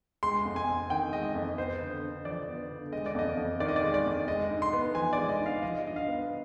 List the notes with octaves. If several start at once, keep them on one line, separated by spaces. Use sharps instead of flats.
G#3 C6
F2
G#5
C4
D#3 G5
G#3 D#5
F2
B3 C5
D3
D3
F3 D5
B3
D3
G#3 D#5
D5
F2 D#5
F2
D#3 D5
D#5
D5
G#3
D5
F2
G#3 D#5
G#2
C6
B3
F3 G#5
D5
G#3
D#5
G#2
F5
F3 D#5
G2 D#5
F5
B3